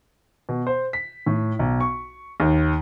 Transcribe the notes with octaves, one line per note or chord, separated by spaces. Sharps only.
B2
C5
B6
A2
B1
C#6
D#2